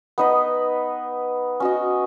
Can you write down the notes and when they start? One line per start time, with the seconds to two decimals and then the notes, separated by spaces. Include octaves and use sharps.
0.18 B3 D#4 B4 D#5
1.60 C#4 F#4 D#5